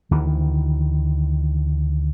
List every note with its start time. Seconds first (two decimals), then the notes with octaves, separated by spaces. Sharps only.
0.11 D2 D#3 E3